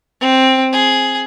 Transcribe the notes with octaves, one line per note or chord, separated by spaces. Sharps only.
C4
G#4